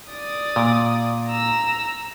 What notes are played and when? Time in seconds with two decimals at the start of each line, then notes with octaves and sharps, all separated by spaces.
0.11 D5 D#6
0.56 A#2
1.28 A#5 E6